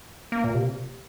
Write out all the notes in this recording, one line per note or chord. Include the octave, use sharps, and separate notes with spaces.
A#3
A#2
C3